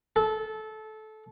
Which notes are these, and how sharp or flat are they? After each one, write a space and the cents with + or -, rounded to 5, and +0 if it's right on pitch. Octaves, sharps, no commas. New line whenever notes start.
A4 -20